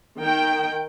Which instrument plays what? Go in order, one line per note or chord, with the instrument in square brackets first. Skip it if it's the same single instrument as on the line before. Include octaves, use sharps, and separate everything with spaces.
[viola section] D#3 G5